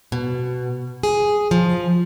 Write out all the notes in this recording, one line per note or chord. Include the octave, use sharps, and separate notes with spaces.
B2
G#4
F3